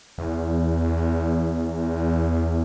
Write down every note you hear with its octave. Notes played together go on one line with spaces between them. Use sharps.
E2